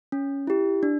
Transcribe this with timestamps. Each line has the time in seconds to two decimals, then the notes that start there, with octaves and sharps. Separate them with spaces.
0.12 C#4
0.47 E4 G4
0.83 D4